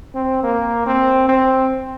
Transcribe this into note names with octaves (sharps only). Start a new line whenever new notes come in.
C4
A#3
C4
C4